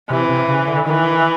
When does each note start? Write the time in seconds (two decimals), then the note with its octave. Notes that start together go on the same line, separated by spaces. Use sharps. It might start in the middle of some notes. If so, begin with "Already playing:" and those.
0.10 C3 E3
0.29 C3
0.48 C#3
0.67 D3
0.86 D#3 E3